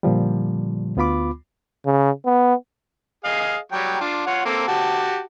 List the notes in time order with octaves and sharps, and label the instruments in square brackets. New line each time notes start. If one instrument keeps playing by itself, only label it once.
[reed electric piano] A#2 D3 F3 G3
D2 B3 F4 B5 D6
[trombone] C#3
B3
[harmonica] G#4 D#5 F5
F#3 G3 G5
D4 F4
F4 C#5 F#5
A#3 C4 A4
F#4 G4 A5